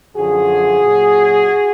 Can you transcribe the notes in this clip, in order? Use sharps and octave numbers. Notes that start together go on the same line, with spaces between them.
F#2 D3 F3 F#4 G#4
A#2 F#3